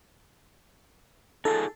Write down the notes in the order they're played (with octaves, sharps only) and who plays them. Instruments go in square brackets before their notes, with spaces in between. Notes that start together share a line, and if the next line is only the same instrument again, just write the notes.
[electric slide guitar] D#4 F4 G#4 [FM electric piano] A4